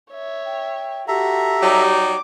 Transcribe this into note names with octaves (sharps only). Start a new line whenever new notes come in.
C#5 E5
G5
F#4 G4 A4 E5 A#5
F#3 G3 D#4 D6